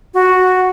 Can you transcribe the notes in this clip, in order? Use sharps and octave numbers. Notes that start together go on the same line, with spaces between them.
F#4